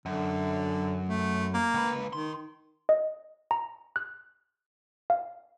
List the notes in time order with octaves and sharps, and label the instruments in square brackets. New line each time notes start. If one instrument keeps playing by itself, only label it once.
[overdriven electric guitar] F#2 [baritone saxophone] D3
[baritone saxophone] A3
A#3
[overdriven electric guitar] C#2 B4
[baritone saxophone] D#3 [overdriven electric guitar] C6
[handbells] D#5
A#5
F#6
F5